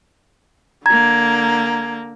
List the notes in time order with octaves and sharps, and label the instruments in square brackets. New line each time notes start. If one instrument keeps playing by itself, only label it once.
[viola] D3 A#3 [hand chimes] A#5 G#6